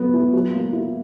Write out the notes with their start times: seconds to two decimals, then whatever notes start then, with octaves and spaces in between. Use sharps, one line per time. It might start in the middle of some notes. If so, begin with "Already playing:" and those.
Already playing: F#3 B3
0.14 E4
0.33 F#3
0.53 A#3
0.73 E4